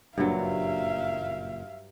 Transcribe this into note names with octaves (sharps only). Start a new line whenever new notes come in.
F#1 G2 A#2 F#3 E5 F5